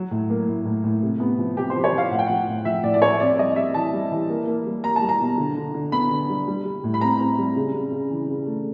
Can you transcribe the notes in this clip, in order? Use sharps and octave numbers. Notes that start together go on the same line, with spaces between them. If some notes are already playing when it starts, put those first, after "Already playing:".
Already playing: F#3
A2
A#3
A2
A2
A2
C3
B3
F3
C3 G4
C5
F3
C#5
F3 F5
A2 F#5
G5
F3 F#5
A2
F3 E5
A2 D5
D5
A2 C#5
C4 D5
G3 D#5
G3 E5
E3 A5
G3
E3
A#3
A#3
G3
A#3 A#5
A5
G3
A#5
B2
D3
D3
D3
B3 B5
D3
G3
G3
G3
A2
B5
C4 A#5
C4
G3
C#3
C#3
C#3
E3
C#3
A3